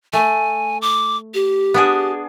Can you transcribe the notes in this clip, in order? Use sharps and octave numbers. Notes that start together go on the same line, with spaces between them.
A3 G#5
D6
G4
B3 D4 G#4